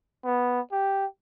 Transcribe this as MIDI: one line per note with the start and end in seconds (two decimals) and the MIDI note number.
0.25 0.60 59
0.72 1.06 67